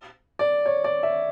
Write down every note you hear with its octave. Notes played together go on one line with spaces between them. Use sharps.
D5
C#5
D5
E5